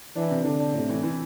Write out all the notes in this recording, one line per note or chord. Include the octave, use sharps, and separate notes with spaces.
E3 D4
C3
D3 D4
D4
A2 C3
E3
E3